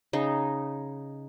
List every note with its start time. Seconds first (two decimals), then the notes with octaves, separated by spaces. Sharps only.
0.13 C#3 D#4